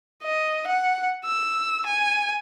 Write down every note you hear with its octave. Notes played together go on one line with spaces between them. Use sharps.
D#5
F#5
E6
G#5